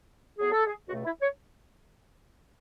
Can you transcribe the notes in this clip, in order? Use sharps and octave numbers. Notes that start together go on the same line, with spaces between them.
A2 F#3 B3 G#4
A4
G#4
C#2 B2 A3 F#4
E4
C#5